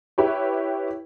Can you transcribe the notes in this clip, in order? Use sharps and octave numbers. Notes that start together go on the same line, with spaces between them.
E4 G4 B4 C#5